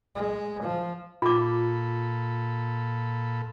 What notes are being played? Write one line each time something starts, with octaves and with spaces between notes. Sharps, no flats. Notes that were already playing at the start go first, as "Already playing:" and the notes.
G#3
F3
A#2 F4 A4 B5 D6